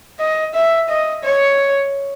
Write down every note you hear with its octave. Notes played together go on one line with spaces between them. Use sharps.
D#5
E5
D#5
C#5